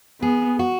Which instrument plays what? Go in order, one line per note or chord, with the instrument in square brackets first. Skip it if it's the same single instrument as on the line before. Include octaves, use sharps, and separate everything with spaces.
[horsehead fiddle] B3 [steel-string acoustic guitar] G#4
[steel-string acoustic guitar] F#4